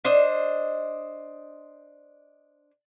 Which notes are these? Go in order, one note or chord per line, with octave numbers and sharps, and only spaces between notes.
D4 C5 D#5